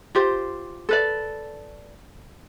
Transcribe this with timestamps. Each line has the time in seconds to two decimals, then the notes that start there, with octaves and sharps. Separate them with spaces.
0.15 F4 G4 C5
0.89 A4 B4 D5